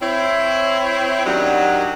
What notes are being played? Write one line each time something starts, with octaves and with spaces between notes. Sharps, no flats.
C4 E4 C#5
F#2 D#3 F#3 G3 D4 F#4